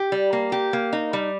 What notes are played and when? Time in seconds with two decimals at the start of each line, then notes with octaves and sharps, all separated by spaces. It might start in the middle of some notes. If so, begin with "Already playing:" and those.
Already playing: G4
0.12 G3
0.33 A#3
0.52 G4
0.73 A#3
0.93 D#4
1.13 G3